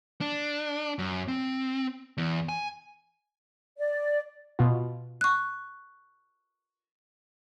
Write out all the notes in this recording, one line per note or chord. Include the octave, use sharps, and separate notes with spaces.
D4
F#2
C4
E2
G#5
D5
B2 F4
C#6 F#6